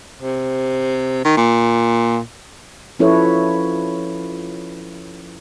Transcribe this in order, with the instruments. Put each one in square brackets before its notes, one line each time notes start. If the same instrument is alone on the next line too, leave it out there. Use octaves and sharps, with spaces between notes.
[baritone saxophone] C3
D#3
A#2
[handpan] F3 C#4 E4 A4 B4 C#5